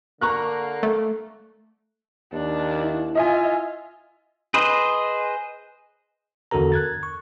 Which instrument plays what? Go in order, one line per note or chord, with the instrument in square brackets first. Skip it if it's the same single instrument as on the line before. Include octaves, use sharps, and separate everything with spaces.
[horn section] D3 A#3 [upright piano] A#5 C#6 F#6
[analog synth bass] A3
[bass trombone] D#2 [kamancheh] D4
[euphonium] E4
[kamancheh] F4 [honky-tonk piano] D#5 E5 G#5
[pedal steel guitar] G#4 B4 C5 D#5
[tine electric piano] E2 D3 F#4 A4 A#4 A#5
F#6 G#6 A6
C#6